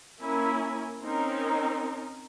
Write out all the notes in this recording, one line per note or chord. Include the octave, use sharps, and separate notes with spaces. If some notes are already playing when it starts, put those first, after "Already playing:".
A#3 C#4 E4 A#4 G#5
C4 C#4 D#4 A#4